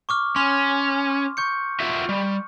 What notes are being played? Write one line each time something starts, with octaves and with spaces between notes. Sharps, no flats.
C#6 D6 F6
C#4 C6 F6
C#6 G6 C#7
F4 F#4 E5
G3